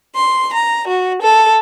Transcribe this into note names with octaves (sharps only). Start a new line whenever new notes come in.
C6
A#5
F#4
A4